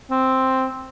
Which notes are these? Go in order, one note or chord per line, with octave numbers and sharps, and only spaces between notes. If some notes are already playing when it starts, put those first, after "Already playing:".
C4